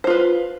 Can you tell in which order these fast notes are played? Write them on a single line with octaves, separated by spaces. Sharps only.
C5 F4 B4